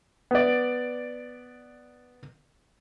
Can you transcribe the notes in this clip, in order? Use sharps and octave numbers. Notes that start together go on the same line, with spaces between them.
B3 D5